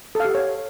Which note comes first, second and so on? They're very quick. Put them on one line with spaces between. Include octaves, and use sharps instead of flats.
A4 F5 G4 F#5 C#5